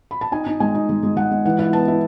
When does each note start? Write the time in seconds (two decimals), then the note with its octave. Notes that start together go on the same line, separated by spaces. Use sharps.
0.11 B5
0.21 A5
0.32 D#4 G#5
0.46 D#4
0.60 G#3 G#5
0.75 D#4
0.89 G#3
1.03 G#3
1.17 G#3 F#5
1.31 G#3
1.45 E3 F#5
1.59 E4 F#5
1.73 B3 A5
1.88 E4